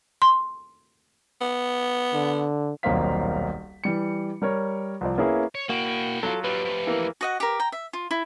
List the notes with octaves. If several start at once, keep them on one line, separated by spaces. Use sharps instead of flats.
C6
B3
D3
D#1 B1 A#3 C4 F5 B6
E3 G3 C#7
G3 A#4 C#5
C2 F3 D5
A#3 B3 C#4 E4 G#4
C#5
A#3 E4 F#4 G5
F#3 F4 A4
D#2 G3 G4 B4
F3 A3
E3 A#3
F#4 D#5 F#5
G4 A#4
G5 A#5
E5
F4
E4